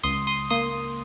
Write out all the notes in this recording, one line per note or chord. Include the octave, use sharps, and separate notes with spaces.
C#2 C6 D#6
C6 D#6
A#3 C6 D#6